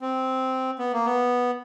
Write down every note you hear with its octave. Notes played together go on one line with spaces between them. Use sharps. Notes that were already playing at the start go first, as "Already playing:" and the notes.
C4
B3
A#3
B3